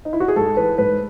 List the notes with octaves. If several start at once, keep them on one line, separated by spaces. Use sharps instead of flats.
D#4
E4
F#4
G#4
G#2 A4
E3 B4
G#2 B4